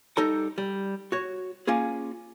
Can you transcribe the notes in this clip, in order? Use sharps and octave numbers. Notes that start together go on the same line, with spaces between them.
G3 D#4 A4 A#5
G3
F#4 C#5
A#3 C#4 F4 G#4